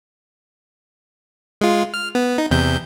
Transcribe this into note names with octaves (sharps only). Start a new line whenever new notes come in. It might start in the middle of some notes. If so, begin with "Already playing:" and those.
G#3 F4
F6
B3
D#4
E2 C3 G6